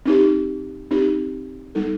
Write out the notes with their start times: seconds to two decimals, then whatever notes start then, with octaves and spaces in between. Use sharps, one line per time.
0.06 C4 D#4 G4
0.91 C4 D#4 G4
1.75 G3 B3 D#4 A4